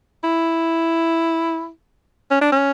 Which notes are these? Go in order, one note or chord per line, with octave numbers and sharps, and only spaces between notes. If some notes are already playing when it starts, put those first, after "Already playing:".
E4
C#4
D4
C#4